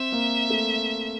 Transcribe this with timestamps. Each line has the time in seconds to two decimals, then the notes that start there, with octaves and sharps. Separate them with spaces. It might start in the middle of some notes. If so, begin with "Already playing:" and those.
Already playing: C4 E5
0.12 A#3
0.50 A3